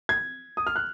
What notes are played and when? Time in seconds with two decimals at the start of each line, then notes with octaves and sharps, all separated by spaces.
0.09 G#6
0.57 D#6
0.67 F6
0.76 F#6